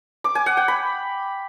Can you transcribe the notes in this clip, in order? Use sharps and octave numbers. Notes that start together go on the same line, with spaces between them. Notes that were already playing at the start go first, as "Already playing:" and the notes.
D6
G#5
F#5
G5
B5